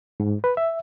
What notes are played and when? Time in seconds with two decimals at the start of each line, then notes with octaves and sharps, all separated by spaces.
0.20 G#2
0.44 B4
0.57 E5